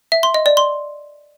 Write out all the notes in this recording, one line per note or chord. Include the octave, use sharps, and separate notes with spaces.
E5
C6
D#5
D5
C6